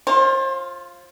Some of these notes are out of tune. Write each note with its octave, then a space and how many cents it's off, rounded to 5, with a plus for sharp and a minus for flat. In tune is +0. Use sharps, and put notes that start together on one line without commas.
F4 +0 C5 +35